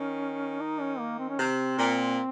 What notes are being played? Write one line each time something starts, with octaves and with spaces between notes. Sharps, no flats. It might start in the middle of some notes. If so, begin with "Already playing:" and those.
Already playing: D#3 C#4
D#4
C#4
A#3
C4
C#4
C3 C4
A#2